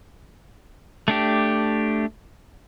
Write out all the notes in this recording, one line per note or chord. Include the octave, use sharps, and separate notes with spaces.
A3 D4 G4